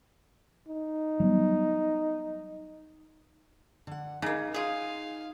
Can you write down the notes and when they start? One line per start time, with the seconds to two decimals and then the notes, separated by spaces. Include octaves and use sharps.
0.68 D#4
1.20 F#3 G3 B3
3.87 D3 F#5
4.22 C#3 A#3 D#4
4.54 F4 G#4 F5